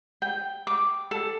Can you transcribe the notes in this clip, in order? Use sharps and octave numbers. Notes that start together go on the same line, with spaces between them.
G5
D6
A4